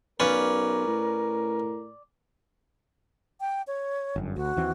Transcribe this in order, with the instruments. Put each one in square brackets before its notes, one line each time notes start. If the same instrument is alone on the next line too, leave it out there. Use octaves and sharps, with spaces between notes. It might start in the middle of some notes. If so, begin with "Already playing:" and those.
[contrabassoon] B1 [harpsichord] C#4 B4 [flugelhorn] A#4 [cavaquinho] D5 F5
[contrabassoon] A2
[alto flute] G5
C#5
[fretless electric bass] G1 F#2
[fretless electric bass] D2 [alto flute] F#4
[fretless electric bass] D#2 E3 C4